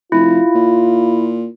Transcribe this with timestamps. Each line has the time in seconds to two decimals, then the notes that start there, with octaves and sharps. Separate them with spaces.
0.12 F1 E4 F4
0.55 A#2